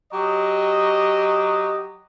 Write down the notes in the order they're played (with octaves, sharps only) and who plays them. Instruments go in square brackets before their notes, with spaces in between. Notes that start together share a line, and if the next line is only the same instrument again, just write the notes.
[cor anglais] F#3 [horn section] G4 D#5